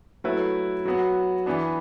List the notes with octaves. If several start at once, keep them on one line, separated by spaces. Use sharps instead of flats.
F#3 A3 E4 B4
F#3 B3 F#4
E3 B3 D4